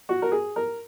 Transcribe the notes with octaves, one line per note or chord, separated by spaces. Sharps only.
F#4
A#4
G#4
A#4